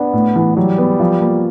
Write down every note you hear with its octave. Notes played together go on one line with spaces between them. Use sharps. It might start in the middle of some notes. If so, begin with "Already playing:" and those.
Already playing: B3 D4
A2
E3
F#3 G3
B3
F3
A#3